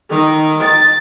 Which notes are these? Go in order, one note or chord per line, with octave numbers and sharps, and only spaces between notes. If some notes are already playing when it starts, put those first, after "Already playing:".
D#3
A6